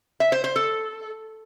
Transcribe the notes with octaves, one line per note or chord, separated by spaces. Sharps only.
E5
C5
C5
A4